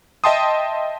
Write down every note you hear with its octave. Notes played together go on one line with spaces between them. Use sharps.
D#5 E5 G5 A5 C6 D#6